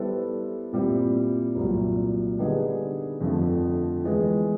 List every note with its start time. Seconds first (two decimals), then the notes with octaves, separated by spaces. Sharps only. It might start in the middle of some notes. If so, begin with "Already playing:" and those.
Already playing: G3 B3 E4 A4 C5
0.73 A#2 G3 C4 E4
1.55 C2 A#2 F#3
2.38 D3 G3 B3 D#4 G#4
3.21 F2 D3 F3 A3
4.04 E3 G#3 B3